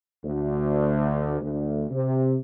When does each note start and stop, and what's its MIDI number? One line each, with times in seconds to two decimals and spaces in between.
0.24 1.39 38
1.41 1.84 38
1.91 2.36 48